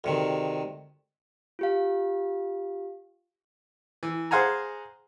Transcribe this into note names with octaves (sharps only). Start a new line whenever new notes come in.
D2 C3 D#3
F4 G4 F5
E3
G#4 C5 F5 F#5 G#5 A#5